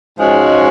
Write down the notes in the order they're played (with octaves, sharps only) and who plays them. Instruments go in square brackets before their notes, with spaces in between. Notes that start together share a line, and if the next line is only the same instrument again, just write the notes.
[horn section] G#2 F3 G#3 C#4 F#4